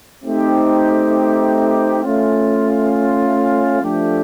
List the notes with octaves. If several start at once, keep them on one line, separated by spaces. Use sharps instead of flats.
A3 C4 D#4 G4
A3 C#4 F4
F3 A3 D4 G4